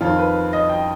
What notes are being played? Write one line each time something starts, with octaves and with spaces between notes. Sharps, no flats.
F2 D#3 F4
B4
D#5
G5